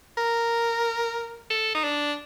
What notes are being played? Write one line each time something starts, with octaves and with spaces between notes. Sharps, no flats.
A#4
A4
D#4
D4